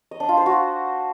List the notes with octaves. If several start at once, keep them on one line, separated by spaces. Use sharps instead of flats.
D#5
D4
F4
C5
F#4